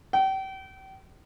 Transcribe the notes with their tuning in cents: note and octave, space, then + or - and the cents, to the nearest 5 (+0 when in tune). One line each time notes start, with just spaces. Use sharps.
G5 -35